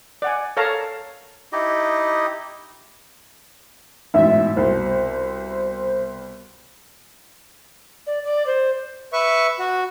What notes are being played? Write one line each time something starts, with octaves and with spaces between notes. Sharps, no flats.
D5 F#5 G#5
A4 A#4 C#5 F5 A5 A#5
D#4 E4 G4 D#5
A1 G#2 B2 E5
C2 B2 C5
D5
D5
C5
B4 E5 C#6
F#4